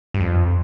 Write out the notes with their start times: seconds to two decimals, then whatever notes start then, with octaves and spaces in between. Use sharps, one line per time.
0.14 G2
0.20 F2